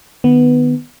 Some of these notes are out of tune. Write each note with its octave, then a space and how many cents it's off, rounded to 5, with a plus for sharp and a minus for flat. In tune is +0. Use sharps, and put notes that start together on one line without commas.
D#3 -35 B3 +0